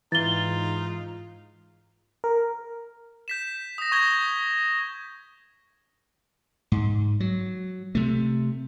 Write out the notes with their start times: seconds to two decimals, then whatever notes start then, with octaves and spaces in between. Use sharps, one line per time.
0.12 G#2 E3 D#4 F4 A6 G7
2.24 A#4
3.28 G6 B6 E7
3.78 D#6 A#6
3.92 C#6 G6 G#6 A#6 E7 G7
6.72 G#2
7.20 F#3
7.95 C3 A3